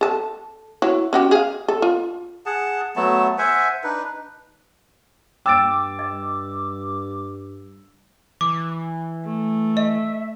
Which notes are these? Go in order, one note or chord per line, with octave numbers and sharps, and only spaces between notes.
A4 A5
E4 F#4 C#5
C#4 F#4 G4
G#4 F5
A4
F4
G#4 F#5 A5
F#3 A3 B3 A5
C5 E5 F#5 G#5
D4 D#4 B4
G2 G5 D6 E6 A6 D7
D#5
E3 D6
A3
D#5 E5